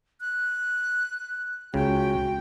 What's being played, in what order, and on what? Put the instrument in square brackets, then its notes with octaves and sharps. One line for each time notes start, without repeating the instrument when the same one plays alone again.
[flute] F#6
[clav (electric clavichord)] C#2 C#3 [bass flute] F#4 [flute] G5